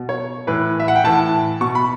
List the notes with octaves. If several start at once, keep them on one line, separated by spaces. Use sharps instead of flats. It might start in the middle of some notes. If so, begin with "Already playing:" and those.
Already playing: B2
C#5
A2 E3 B4
E5
F#5
G5
A2 E3 A5
B2 C#6
B5